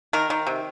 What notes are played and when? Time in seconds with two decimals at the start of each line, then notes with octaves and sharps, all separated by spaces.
0.13 D#3 A#4
0.30 D#3
0.47 C3